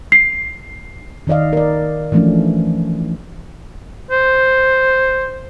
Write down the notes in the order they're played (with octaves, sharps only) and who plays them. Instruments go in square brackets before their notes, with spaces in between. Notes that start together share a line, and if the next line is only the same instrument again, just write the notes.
[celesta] C7
[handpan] D#3 D#4 D5 D#5 F5
A#4 D5
E3 F3 A3 C#4 D4
[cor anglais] C5